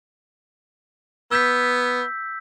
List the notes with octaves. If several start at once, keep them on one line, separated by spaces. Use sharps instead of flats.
B3 E6 G6 B6